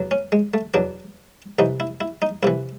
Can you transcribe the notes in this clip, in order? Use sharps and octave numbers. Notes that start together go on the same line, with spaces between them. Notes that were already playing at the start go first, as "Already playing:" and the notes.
Already playing: E2 B2 F#3
C#4
G#3
A3
E2 B2 F#3 D4
C2 C3 E3 D#4
E4
E4
D#4
C2 C3 E3 E4